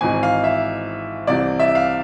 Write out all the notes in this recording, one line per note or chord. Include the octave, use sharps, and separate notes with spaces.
G#1 G#2 E3 G#5
F5
E5
C2 C3 E3 D5
E5
F5